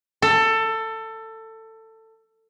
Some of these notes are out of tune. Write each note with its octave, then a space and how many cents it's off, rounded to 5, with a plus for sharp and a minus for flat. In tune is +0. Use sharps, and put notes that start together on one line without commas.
A4 +20